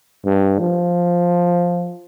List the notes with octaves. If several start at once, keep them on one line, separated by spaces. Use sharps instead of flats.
G2
F3